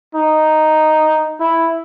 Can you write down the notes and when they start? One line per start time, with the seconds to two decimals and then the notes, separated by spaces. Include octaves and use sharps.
0.15 D#4
1.40 E4